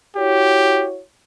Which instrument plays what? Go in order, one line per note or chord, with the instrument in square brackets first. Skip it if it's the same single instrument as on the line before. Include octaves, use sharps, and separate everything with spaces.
[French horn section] E4 F#4 C#5 [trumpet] G4